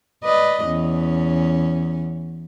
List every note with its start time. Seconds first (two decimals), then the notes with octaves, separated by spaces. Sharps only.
0.24 B4 D5 D#5
0.66 E2 C#4